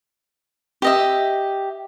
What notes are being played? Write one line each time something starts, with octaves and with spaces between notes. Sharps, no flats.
G4 D#5 E5